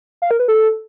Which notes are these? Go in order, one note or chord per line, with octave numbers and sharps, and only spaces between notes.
F5
A#4
B4
A4